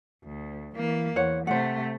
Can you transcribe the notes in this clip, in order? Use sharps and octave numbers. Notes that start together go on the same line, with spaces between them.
D2
E3 A#3
E2 C5 C#5 F#5
C3 A3 C5 F#5